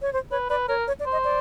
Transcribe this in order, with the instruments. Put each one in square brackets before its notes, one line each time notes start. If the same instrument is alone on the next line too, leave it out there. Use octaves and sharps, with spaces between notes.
[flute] C#5
C5
[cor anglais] B4 [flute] C#5
[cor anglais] B4 [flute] D5
[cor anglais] A#4 [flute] C#5
[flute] C#5
D5
[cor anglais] C5
[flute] D#5
D5